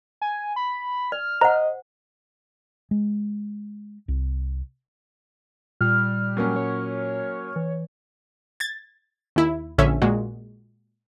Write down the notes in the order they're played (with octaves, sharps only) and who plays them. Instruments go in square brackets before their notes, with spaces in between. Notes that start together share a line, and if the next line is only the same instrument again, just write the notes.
[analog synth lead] G#5
B5
[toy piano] D5 [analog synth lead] F6
[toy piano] C5 F#5 [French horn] D#5 [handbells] A#5
[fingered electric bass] G#3
C2
[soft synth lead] A#2 [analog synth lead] G3 [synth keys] F6
[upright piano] F#3 A#3 C#4
[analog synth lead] C#5
[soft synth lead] E3
[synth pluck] G#6 A6
D#2 E4
A#1 D3 C#4 E5
A#2 G#3 F#4